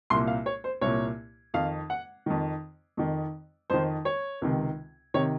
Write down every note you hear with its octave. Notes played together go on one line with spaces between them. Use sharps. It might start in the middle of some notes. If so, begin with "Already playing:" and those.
C2 A#2 C6
F5
C#5
C5
C2 A#2 C#5
F2 D#3 F5
F#5
F2 D#3
F2 D#3
F2 D#3 C5
C#5
C#2 C3 D#3
C3 D#3 C#5